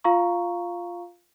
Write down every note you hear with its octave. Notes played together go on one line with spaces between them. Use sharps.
F4 F5 A#5 C#6